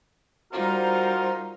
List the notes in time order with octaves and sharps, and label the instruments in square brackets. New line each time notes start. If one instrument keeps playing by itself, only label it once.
[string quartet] G3 D#4 [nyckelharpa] F4 [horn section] F#4 C5 [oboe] A#4